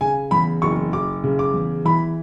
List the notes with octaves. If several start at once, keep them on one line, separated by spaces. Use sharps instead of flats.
C#3 G#5
E2 B5
F#1 C#6
F#1 D6
C#3
D6
E2
E3 B5